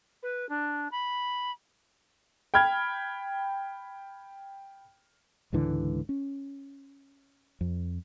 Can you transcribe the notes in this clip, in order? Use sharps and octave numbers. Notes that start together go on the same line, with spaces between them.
B4
D4
B5
G5 B5 F6 G#6
C#2 G#2 D3 E3
C#4
F2